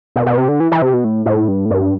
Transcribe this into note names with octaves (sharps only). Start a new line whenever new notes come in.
B2
B2
C3
D3
E3
E3
C3
B2
A2
A2
G2
A2
G2